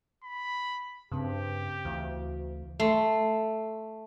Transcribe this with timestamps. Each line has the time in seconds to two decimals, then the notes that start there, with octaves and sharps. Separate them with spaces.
0.24 B5
1.12 G2 C#3 C4 G4
1.85 D2 E3 F5
2.80 A3 C6